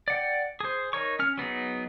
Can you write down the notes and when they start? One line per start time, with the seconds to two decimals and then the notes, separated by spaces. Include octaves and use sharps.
0.08 D5 F#5 G5
0.60 G#4 C5
0.93 D#4 A#4 C#5 C#6
1.19 C#4 F6
1.37 F#3 B3 D#4 G#4